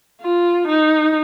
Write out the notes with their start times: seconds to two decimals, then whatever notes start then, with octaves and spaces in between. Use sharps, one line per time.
0.21 F4
0.68 D#4